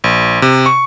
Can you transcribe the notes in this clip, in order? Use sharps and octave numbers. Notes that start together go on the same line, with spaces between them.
A#1
C3
C#6